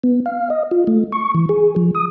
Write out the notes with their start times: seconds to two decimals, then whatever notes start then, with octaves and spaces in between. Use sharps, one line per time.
0.04 B3
0.26 F5
0.50 D#5
0.71 F4
0.87 A3
1.12 C#6
1.35 E3
1.49 G#4
1.76 F3
1.95 D#6